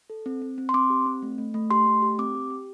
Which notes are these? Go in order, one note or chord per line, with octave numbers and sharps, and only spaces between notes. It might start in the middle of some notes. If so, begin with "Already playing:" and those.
A4
C4
C4
C4
C6
C4 D6
G4
C4
A3
A3
A3
G4 C6
A3
G4
C4 D6
G4
G4